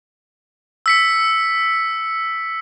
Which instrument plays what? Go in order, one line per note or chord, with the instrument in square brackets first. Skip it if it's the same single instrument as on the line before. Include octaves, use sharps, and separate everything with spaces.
[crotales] E6 B6 C#7